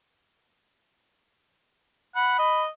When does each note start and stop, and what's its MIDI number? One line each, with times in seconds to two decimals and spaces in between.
2.15 2.36 78
2.15 2.62 83
2.39 2.69 75